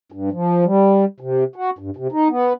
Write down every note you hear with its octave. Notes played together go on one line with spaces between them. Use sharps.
G2
F3
G3
C3
F#4
G2
C3
D#4
B3